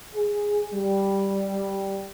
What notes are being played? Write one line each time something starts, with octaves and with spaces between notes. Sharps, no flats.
G#4
G3